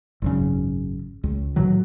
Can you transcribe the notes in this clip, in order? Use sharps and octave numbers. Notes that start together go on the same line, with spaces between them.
G#1 F#2 C#3
C#2
A2 D#3 E3 F#3